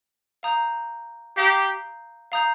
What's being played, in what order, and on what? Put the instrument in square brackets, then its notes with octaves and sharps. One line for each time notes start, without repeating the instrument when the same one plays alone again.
[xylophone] F5 A#5 D#6 G6
[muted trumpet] G4 [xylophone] F5 A#5 D#6 G6
[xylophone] F5 A#5 D#6 G6